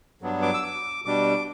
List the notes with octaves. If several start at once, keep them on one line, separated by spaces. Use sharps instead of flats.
G2 F#3 B3 D4
D6
E6
D6
B2 G3 D4 D6